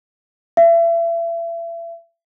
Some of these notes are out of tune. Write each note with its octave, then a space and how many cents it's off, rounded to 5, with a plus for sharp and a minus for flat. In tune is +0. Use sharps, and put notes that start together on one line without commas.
E5 +35